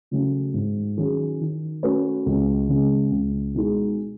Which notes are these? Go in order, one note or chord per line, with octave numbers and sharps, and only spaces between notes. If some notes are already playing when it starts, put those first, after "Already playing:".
C#3 F#3 A3 C#4
G#2
D#3 F#3 C#4 G#4
D#3
A3 C#4 F#4 B4
C#2
C#3 G#3
C#2
B2 G#3 D#4 G#4